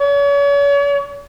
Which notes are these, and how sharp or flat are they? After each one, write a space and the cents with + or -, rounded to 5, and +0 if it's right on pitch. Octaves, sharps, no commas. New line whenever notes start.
C#5 +40